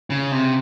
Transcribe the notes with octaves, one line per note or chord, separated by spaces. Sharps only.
C#3
C3